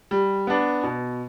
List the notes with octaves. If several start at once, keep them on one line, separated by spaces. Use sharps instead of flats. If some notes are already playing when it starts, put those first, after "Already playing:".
G3
B3 D4
B2